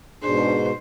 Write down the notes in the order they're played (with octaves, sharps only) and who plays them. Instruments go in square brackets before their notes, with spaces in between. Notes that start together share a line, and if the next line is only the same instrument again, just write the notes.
[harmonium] G#2 B2 [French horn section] D4 G#4 [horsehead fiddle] C5